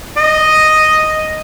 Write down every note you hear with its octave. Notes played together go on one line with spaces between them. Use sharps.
D#5